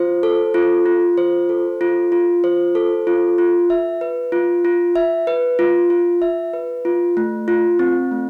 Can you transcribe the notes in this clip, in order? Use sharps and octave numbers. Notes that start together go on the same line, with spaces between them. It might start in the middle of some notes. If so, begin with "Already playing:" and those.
Already playing: F4 C5
A4
F4
F4
C5
A4
F4
F4
C5
A4
F4
F4
E5
B4
F4
F4
E5
B4
F4
F4
E5
B4
F4
A3
F4
C4
A3